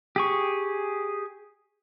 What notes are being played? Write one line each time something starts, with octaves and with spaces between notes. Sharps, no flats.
G4 G#4 C#6